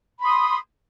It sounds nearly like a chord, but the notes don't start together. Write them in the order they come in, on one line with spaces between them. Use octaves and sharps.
B5 C6 D#6